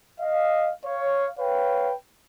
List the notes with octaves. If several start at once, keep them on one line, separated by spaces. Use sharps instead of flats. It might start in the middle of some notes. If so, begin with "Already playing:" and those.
D#5 F5
C#5 F5
B4 C#5 F5 G5